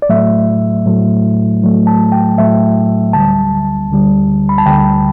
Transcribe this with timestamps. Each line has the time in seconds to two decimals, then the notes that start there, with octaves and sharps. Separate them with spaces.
0.02 D5
0.09 A2 F#3 A3 E5
0.86 A2 F#3 A3
1.62 A2 F#3 A3
1.87 A5
2.12 G5
2.38 A2 F#3 A3 E5
3.13 D2 D3 G3 A5
3.90 D2 D3 G3
4.49 B5
4.58 A5
4.66 D2 D3 G3 G5